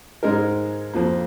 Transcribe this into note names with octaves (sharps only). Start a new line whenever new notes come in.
G#2 G#3 D#4 A#4
F2 F3 A#3